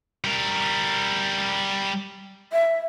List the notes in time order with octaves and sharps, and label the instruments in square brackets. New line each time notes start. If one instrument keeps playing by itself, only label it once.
[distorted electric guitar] G3 A#4
[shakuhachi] E5